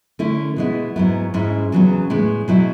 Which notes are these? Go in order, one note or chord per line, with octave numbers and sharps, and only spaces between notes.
D3 A3 C#4 E4
B2 G#3 B3 E4
G#2 F#3 B3 E4
G#2 G#3 C#4 E4
E2 C#3 F#3 B3
A2 G#3 B3 D4
B2 F#3 B3 E4